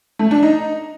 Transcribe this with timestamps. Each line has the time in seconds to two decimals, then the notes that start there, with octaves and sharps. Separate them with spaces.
0.19 A3
0.31 D4
0.43 D#4